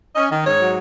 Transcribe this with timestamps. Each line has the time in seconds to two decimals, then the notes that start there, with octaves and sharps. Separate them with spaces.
0.16 C#4 D#5
0.30 D#3
0.44 G#2 C#5
0.59 F#3